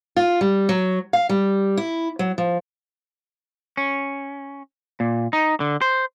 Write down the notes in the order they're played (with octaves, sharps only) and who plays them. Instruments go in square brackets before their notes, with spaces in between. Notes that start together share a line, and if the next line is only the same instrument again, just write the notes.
[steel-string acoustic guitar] F4
G3
F#3
F5
G3
E4
F#3
F3
[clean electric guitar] C#4
A#2
D#4
D3
C5